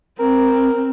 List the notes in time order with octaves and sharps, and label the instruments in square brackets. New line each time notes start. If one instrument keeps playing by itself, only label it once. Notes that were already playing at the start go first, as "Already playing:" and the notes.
[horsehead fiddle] C4 [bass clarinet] A#4